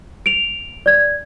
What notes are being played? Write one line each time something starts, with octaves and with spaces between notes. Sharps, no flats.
D7 F7
D5 G#6